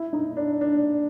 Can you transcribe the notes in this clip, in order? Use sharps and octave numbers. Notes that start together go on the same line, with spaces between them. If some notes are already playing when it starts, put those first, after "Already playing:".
Already playing: E4
D#4
D4
D4